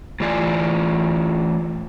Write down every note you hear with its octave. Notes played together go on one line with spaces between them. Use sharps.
A2 E3 F4 D5 G#5